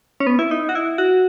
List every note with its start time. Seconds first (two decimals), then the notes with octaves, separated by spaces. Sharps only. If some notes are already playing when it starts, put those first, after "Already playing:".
0.20 C#4
0.27 B3
0.39 E4
0.51 D#4
0.69 F#4
0.75 E4
0.98 F#4